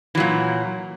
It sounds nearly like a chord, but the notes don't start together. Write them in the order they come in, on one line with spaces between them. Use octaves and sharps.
E3 F#3 A#2